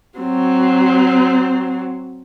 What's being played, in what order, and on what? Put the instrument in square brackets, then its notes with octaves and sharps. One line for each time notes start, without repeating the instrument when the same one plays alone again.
[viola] F#3 C4